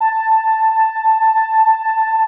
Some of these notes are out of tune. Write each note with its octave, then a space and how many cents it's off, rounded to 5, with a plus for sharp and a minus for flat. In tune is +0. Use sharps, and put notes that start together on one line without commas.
A5 +10